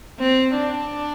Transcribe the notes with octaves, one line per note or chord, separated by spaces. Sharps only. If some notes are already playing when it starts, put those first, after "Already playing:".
C4
D4